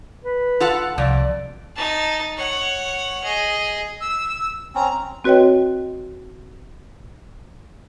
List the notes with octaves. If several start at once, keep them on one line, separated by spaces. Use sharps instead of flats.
B4
F4 A4 F#5
C2 F2 D5
D#4 A5
C#5 F#5
G#4 D#5
E6
C4 C#4 A#5
C4 F#4 B4 C#5 D#5 G5